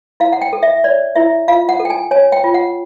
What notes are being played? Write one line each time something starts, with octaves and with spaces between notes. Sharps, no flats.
E4 F5
F#5
G5
A4
E5
C#5 D5
E4 E5
F4 F5
F#5
A4
G5
G#5
C#5 G#5
G5
F4
F#5